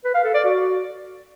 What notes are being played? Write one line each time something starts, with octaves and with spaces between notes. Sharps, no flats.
B4
F5
A4
D5
F#4